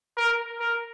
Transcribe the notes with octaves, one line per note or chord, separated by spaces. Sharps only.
A#4
A#4